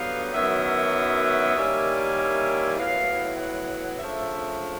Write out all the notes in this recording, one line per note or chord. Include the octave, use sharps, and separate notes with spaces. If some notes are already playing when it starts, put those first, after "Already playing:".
Already playing: G2 D3 F#3 B3 D#4 F5
F#2 D#3 F#3 B3 E4 E5
E5
D#3 G3 A#3 C#4 E4
E5
A2 F#3 B3 E4 F5
F#5
C#3 F3 A3 D4 E5